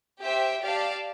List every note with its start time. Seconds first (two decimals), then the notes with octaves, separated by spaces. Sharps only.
0.23 G4 C5 E5 G5
0.63 G4 D5 F5 A5